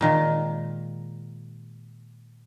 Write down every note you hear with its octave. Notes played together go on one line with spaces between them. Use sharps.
A#2 D#3 G#3